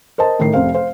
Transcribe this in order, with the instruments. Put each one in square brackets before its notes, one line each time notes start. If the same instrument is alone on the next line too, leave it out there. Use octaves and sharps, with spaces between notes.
[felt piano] A#4 C5 D#5 A5
A2 D#3 A#4 C7
F1 C3 C5 F5
C5 F5